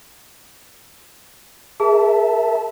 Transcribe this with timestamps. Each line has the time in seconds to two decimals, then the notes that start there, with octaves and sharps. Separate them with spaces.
1.80 G#4 A#4 E5 A5